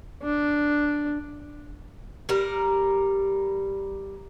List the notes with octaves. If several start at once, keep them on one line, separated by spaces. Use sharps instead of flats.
D4
G3 A#4